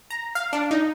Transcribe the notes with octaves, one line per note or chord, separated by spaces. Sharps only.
A#5
F5
D4
D#4